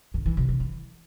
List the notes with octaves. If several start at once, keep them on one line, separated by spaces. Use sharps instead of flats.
D3
E3
C3
D3
E3